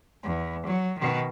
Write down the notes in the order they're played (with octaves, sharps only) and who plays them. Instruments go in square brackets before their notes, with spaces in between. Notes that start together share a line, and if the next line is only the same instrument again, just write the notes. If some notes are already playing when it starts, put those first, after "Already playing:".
[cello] E2
F#3
B2 D#3